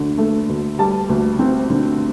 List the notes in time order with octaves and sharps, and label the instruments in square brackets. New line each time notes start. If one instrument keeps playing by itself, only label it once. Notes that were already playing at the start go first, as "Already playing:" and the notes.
Already playing: [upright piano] D2 D3
A3
D2
G3 A5
D2
C4
D3